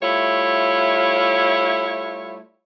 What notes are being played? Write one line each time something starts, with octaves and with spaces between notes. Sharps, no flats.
G3 A3 E4 F4 C#5